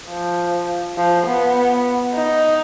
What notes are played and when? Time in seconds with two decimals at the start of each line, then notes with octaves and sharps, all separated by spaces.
0.09 F3
0.97 F3
1.27 B3
2.15 D#4